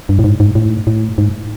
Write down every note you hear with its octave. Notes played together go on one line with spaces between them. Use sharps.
G2
A2
G#2
G#2
A2
A2
G#2